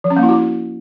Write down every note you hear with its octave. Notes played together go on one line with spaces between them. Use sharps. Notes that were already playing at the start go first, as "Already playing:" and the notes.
F3
C#4
A#3
E4
F#4